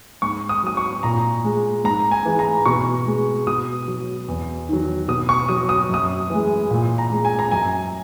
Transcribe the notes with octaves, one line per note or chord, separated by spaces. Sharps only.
G#2 C#6
D#6
F#3 D#6
C#6
A#2 A#5
G#3
G#2 A#5
G#5
E3 G#3
A#5
B2 C#6
G#3
B2 D#6
F#3
E2
D#3 F#3
B2 D#6
C#6
F#3 D#6
D#6
F#2 D#6
E3 G#3
A#2
A#5
G#3
G#5
A#5
F#2 G#5